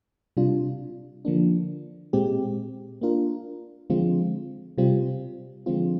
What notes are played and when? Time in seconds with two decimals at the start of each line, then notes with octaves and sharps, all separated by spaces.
0.37 C3 G3 D4 F4
1.25 D3 F3 A#3 D4
2.13 A#2 G#3 C4 G4
3.01 A#3 D4 F4 A#4
3.90 D3 F3 G#3 C4 F4
4.78 C3 G3 C4 F4
5.66 D3 F3 G#3 C4 F4